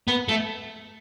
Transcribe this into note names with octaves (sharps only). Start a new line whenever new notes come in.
B3
A3